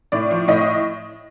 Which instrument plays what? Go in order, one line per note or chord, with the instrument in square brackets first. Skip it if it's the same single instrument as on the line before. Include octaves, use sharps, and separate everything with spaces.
[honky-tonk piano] A2 D5
F3
A2 D#5